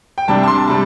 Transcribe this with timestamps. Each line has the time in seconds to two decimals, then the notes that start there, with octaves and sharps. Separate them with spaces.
0.18 G5
0.28 C2 C3 G3 D4 A5
0.43 A5
0.48 C6
0.68 C3 G3 A5